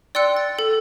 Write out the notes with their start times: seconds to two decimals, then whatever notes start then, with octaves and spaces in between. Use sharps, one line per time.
0.15 D5 G5 C6 E6 F#6 C#7
0.37 A6
0.59 A4